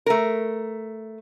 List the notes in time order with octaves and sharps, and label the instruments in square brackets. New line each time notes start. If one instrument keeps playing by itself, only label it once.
[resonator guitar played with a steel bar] A3 A#4